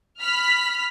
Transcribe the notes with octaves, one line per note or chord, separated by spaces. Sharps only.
B5 F6 B6